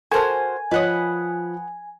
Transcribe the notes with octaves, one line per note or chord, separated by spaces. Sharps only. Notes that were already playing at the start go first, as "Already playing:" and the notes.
F#4 A4 A#4 C5 G#5 A5 F6
F3 B4 C#5 D#5 F#5 D#6